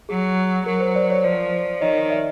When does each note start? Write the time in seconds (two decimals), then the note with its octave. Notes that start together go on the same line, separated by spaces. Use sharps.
0.09 F#3 G#4
0.66 F#3 A#4
0.80 C5
0.95 C5 D5
1.10 C#5
1.24 F3 C5 D5
1.81 D#3 C#5 D#5
2.10 D5 E5